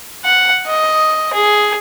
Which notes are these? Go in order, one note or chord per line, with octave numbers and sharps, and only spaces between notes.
F#5
D#5
G#4